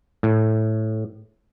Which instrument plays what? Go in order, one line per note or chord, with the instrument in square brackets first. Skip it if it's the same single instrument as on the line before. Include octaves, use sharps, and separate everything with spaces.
[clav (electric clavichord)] A2